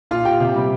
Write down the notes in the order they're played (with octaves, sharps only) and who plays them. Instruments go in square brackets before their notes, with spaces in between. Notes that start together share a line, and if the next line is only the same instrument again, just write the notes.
[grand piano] A#2 F4 F5
A#2 G4 G5
C3
G3